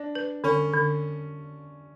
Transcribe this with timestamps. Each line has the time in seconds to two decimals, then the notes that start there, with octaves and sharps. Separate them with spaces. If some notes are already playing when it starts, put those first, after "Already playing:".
Already playing: D4 D5
0.15 B4
0.44 D3 C#4
0.73 D3